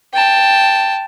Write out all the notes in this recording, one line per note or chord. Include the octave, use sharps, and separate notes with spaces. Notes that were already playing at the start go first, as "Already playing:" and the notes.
G5 A5